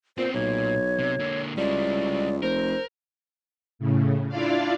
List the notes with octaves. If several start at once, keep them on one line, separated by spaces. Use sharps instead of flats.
A#2 B3 C4 C5
B1 A#2 C#5
C3
D3 A#3
C#2 G3 E4 D5
F1 A#4 C5
A2 C#3
D4 E4 F4 D5 F5